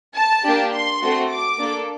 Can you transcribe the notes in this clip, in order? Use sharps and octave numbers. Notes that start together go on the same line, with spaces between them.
A5
A#3 D4 G4
C6
A3 C4 F#4 A4
D6
A#3 D4 A4